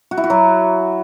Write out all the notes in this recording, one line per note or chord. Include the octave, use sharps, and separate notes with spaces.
F#4
E4
F#4
F#3